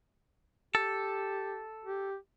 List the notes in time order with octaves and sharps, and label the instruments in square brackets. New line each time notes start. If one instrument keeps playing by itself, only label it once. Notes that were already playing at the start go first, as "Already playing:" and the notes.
[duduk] G4 [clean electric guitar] A4
[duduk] G4